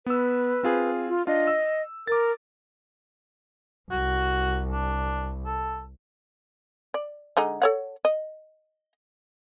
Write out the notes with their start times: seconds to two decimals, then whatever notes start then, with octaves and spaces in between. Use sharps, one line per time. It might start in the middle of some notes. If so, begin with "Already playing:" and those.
0.06 B3 B4 E6
0.63 C4 F4 G#4
1.08 F4
1.27 D4 F4 D#5
1.47 E6
2.07 A#4 D6 A6
3.91 C2 F#4
4.72 D4
5.46 A4
6.94 D5
7.37 D3 G#3 D#4
7.62 A4 C#5 F#5
8.05 D#5